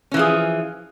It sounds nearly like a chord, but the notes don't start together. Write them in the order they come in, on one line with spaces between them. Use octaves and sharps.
C#4 E3 F3 G#4